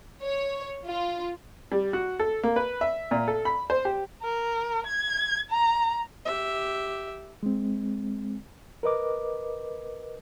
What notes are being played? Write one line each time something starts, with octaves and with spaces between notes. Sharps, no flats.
C#5
F4
G3
F#4
A4
A#3
B4
E5
A#2
A4
B5
C5
G4
A#4
G#6
A#5
G4 E5
G#3 C4
A#4 B4 D#5 D6